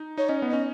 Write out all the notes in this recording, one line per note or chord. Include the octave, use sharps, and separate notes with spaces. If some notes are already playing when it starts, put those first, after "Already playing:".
Already playing: D#4
D#4 C#5
C#4 D#5
B3
C#4 D#5